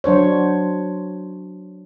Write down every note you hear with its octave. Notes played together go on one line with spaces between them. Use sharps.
F#3 D4 C5 C#5